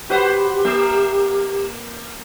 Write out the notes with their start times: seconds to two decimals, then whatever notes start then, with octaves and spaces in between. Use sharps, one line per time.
0.10 F#4 G4 B4 C5
0.65 A#3